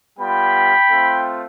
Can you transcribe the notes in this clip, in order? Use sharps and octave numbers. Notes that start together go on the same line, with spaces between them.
G3 B3 F4 G5 B5
A3 C4 F4